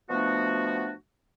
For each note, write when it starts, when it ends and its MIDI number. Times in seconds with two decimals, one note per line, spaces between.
0.09 0.92 47
0.09 0.92 53
0.09 0.92 57
0.09 0.92 59
0.09 0.92 62
0.09 0.92 66